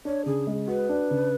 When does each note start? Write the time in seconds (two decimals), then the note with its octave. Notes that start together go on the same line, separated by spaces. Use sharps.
0.05 D4 C#5
0.26 C#3 G#4
0.47 G#3
0.68 F#4 B4
0.89 D4
1.11 C#3